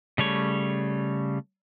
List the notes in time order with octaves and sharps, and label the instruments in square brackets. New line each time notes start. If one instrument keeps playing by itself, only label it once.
[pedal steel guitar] C#3 G3 A3 C#5